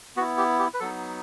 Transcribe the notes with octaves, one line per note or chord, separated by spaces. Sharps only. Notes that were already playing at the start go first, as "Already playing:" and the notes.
B3 E4 F#4
G4
G4
B4
F#3 B3 D#4 A4